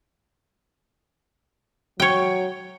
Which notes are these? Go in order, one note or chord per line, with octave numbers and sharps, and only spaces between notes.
F#3 C#5 G5